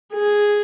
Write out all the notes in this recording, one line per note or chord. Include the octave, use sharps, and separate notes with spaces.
G#4